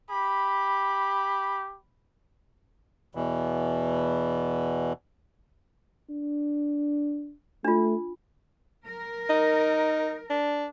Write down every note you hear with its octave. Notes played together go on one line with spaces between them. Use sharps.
G4 B5
E2 B2 E3
D4
A3 D4 F4
A#4
D#4
D4